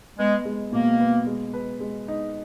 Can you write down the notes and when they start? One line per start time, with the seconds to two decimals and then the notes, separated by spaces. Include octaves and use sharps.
0.18 G#3 B3
0.45 G#3
0.72 B2 A#3
1.00 B3
1.27 G#3
1.54 B4
1.80 G#3
2.08 D#4